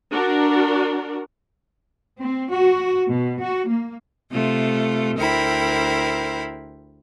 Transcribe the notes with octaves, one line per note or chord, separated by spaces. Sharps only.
D4 F#4 A#4
C4
F#4
B2
F#4
A#3
C3 A3 F4
D2 E4 A#4 C5 G5 B5